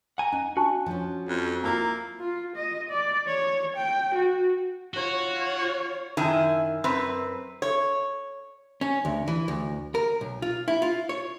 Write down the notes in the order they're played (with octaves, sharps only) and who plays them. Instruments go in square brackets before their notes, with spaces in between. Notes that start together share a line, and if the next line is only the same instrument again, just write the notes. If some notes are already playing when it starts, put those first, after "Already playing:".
[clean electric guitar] F#5 G#5 A#5
[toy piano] C#4 [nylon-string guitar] D#4
[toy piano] D4 A5 C#6 [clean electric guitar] F#4
[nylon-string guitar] F3 C#4
[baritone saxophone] F2
[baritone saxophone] A#3 [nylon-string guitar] E4 F4 [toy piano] A#5 E6
[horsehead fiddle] F4
D#5
D5
C#5
G5
F#4
[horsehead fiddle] F4 C#5 [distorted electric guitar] F#4
[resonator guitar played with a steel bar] F#2 D#3 E4 G#5
F#2 C4 B4
C#5
[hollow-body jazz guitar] C#4
D2
E3
D2
A#4
B1
F4
E4
F4
C#5